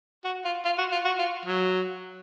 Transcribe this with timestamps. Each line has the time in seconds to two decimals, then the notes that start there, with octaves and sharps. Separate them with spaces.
0.25 F#4
0.45 F4
0.65 F4
0.78 F#4
0.92 F4
1.05 F#4
1.19 F4
1.46 F#3